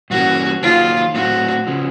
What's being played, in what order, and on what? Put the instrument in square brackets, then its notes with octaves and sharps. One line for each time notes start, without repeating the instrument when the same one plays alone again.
[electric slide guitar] G2 E3 G3 A#3 C#4 [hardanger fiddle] F#4
[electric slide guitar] D#3 F#3 A#3 D#4 G#4 [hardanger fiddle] F4
[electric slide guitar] A2 F#3 A3 C4 [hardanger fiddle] F#4
[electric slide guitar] C#3 F3